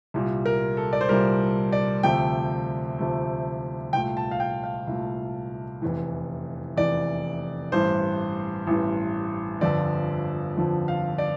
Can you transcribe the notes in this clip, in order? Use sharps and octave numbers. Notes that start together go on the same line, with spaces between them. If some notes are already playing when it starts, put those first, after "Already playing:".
C2 A#2 G3
A#4
A4
D5
C5
C2 A#2 G3 A#4
D5
D2 C3 F3 A3 G5
D2 C3 F3 A3
C2 A#2 A3 G5
A5
F5
G5
F5
C2 A#2 A3
F1 E2 E3
F1 E2 E3 D5
A1 G2 E3 C5
A1 G2 E3
G1 F2 D3 F3 D5
G1 F2 D3 F3
F5
D5